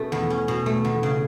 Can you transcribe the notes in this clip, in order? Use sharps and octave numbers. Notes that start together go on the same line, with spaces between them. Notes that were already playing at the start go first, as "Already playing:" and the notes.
Already playing: B2 A3 C#4
E2
C#4
B2
A3
E2
C#3